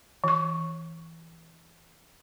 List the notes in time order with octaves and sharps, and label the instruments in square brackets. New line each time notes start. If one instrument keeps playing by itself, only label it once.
[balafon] E3 C#6